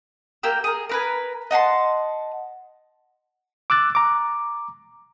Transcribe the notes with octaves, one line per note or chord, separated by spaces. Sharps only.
A#3 G4 G5 E6
G#4 A#4
A#4 B4 G#5
D#5 F#5 A5 C6
D6 E6 F#6 A6
A#5 D6